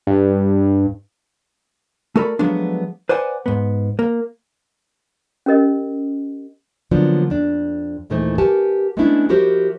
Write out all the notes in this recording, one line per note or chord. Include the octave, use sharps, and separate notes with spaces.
G2
A3 F#4 A4 A#4 D5 B5
F3 F#3 G#3 A3 B3 D4
B4 C5 D5 F#5 G#5
G#2 B3
A#3
C#4 G4 A#4 D#5
D3 F3 F#3 A#3 B3 D4
F2 D4
D#2 A#2 E3 A3 D#4 C5
G4 A#4 B4 F#5 G#5 A5
G#3 A3 B3 C#4 D4 E4
F3 E4 F#4 G4 A#4 C5